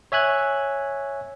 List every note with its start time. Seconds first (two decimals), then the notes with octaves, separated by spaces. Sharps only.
0.12 C#5 E5 G#5 F#6 G#6